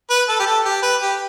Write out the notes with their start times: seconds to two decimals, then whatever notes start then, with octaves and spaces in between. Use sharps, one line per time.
0.10 B4
0.29 A4
0.40 G4
0.46 A4
0.65 G4
0.82 B4
1.01 G4